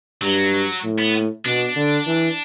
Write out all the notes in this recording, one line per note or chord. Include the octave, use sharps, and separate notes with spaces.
G2 F#3
A2
B3
B2 D4
D3
E3